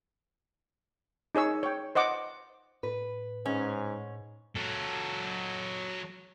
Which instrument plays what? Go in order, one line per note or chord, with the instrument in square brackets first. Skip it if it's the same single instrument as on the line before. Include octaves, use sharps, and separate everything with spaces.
[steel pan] D#4 G#4 C#5 E6
C#5 G5
C5 D#5 F#5 D6
[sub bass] A2 [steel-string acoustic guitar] B4
[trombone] G#2 [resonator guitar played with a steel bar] C#4
[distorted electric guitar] F#3 A4